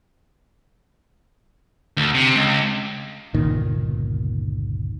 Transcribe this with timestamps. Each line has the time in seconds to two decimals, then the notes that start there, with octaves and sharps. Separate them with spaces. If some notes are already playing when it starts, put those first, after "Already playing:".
1.97 D2
2.15 C3
2.35 C#2
3.34 G1 C#2 A#2 D#3